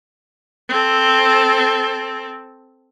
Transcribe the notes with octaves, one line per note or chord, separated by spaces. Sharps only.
C4 A4